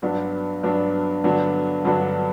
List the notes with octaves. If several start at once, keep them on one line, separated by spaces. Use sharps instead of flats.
G2 F#3 B3 D4
G2 F#3 B3 D4
G2 D3 F#3 B3 D4
G2 D3 F#3 B3 D4